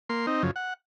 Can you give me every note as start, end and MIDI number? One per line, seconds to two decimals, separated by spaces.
0.09 0.26 58
0.09 0.26 84
0.27 0.43 60
0.27 0.43 63
0.43 0.51 42
0.43 0.51 49
0.43 0.51 53
0.56 0.74 78